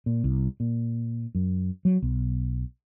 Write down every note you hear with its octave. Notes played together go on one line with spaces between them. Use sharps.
A#2
C2
A#2
F#2
F#3
B1